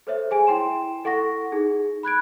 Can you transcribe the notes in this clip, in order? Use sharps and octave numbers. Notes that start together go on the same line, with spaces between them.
A4 C5 C#5 E5
G#4 G#5 D7
E4 G5 C6 E7
E4 A4 F#5 C#6 A#6
D#4 G#4
B5 F#6 G#6 D7